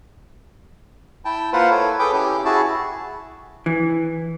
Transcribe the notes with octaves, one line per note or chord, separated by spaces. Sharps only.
E4 G5 A5
A#3 F4 B4 C5 F#5
E4 A4 C#5
G#4 A4 B4 G5 D6
C#4 E4 G4
E4 F#4 G#4 A5
E3